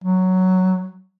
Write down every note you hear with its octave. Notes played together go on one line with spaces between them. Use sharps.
F#3